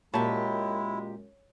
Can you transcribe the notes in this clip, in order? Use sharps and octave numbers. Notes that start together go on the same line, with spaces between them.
F#2 A#2 G#3 E4 G4 C#5 A5